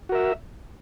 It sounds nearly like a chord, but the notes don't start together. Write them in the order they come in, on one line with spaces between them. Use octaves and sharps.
F#4 A#4 E5